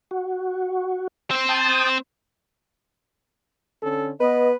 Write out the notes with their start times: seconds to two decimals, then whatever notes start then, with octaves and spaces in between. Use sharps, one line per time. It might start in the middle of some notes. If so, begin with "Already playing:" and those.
0.11 F#4
1.31 C4 C5
1.49 G5 A5 D#6
3.83 D3 C#4 A4
4.20 B3 B4 D#5